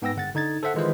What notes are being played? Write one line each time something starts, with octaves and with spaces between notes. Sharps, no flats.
G#2 B3 G5 E6 A#6
G1 F#5 A6
D3 D#4 G#6 A6
A4 C5 E5 F#5
D#3 E3 G#3 F4 B4 C5